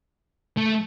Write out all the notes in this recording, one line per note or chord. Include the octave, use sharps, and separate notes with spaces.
A3